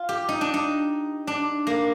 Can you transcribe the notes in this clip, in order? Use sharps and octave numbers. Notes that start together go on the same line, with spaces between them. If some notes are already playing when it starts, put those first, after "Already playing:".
Already playing: F4
G4
D#4
D4
D#4
D4
A#3